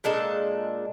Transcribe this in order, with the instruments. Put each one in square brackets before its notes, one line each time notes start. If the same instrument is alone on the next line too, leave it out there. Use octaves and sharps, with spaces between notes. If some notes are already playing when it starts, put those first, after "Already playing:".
[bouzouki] A#2 G#3 D4 A4